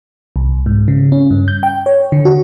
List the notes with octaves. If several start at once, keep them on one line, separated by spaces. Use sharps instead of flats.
C2
G#2
C#3
C#4
G2
G6
G5
C#5
D3
F#4